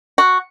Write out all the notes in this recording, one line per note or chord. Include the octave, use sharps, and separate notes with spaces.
F#4